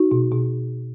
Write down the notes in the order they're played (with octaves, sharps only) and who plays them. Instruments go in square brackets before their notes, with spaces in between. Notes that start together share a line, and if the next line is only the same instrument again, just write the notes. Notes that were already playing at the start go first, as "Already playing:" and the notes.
Already playing: [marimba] D#4 F#4
B2
B2